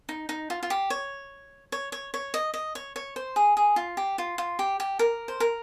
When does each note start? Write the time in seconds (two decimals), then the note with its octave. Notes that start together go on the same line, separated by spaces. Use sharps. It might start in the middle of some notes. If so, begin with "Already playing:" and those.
0.09 D#4
0.29 D#4
0.50 F4
0.63 F4
0.70 G4
0.90 C#5
1.72 C#5
1.92 C#5
2.14 C#5
2.34 D#5
2.54 D#5
2.75 C#5
2.96 C#5
3.16 C5
3.36 G#4
3.57 G#4
3.76 F4
3.97 G4
4.18 F4
4.38 F4
4.59 G4
4.80 G4
4.99 A#4
5.28 C5
5.40 A#4